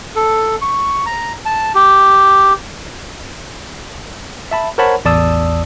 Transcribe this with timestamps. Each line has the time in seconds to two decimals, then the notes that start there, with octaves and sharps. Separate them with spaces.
0.16 A4
0.62 C#6
1.06 A#5
1.46 A5
1.75 G4
4.51 E5 A5 B5
4.78 A#4 C5 C#5 F#5 A5 B5
5.05 A1 E2 D5 A5 D#6 E6